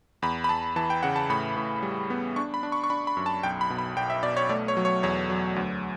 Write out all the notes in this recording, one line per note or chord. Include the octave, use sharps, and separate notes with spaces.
E2 B5
B5
E2 A5
E3 A5
G5
C#3 F#5
A5
A2 B5
A2
G3
B3
D4 C#6
B5
D4
C#6
C#6
D4 B5
B5
F#2
A5
B1 G5
B5
B2
B5
B1 G5
E5
B2 D5
C#5
A3 D5
C#5
F#3
C#5
E2 C#5
F#3
D2